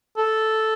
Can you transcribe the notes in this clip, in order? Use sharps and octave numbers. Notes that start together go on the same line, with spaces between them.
A4